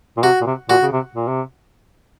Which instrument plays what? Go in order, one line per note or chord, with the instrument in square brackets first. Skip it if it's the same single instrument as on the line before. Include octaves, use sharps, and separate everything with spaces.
[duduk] A#2
[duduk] C3 [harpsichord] F#4
[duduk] A#2
C3
[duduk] A#2 [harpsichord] F#4
[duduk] C#3
C3
A#2
C3